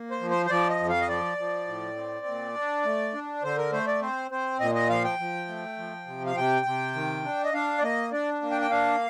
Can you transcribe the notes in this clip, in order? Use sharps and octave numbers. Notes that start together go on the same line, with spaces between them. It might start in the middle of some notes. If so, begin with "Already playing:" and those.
Already playing: A#3
C5
F3
C5
C5
F3 D5
D#5
F2
F5
D#5
F3 D5
F3
A2
C4
A#2
D4
A3
D4
D3 C5
A#4
A3 C5
D5
C4 C5
C4 C5
A#2 D#5
D#5
F3 F5
G5
F3
A3
F3
C3
F5
C3 G5
C3
D#3
D4
D#5
D4 F5
D5
A#3 D#5
D4 D5
A#3
G5
G5
D4 F5